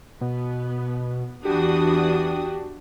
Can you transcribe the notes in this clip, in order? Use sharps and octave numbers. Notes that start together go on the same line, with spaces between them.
B2 B3
E2 E3 D4 F#4 G4 D#6